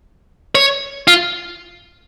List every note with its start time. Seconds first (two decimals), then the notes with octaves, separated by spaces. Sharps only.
0.55 C#5
1.08 F4